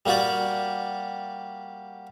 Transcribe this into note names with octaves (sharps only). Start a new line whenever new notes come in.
G3 A#3 F#4 G4 D5